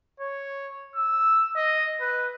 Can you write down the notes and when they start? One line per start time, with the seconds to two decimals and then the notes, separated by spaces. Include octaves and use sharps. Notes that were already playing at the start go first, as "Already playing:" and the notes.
0.20 C#5
0.95 E6
1.56 D#5
2.01 B4